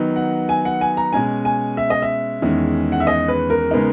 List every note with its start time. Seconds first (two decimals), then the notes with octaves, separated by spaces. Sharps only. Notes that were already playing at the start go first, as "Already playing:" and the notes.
Already playing: D#3 F#3 B3 D#4
0.16 F#5
0.49 G#5
0.65 F#5
0.81 G#5
0.97 A#5
1.13 B2 G#3 C#4 G#5
1.45 G#5
1.77 E5
1.90 D#5
2.02 E5
2.42 E2 D#3 G#3 C#4
2.92 F#5
3.00 E5
3.07 D#5
3.28 B4
3.50 A#4
3.71 C#3 G#3 B3 D#4